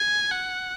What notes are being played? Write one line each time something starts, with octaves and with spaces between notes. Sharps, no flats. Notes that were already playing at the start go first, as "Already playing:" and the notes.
Already playing: G#5
F#5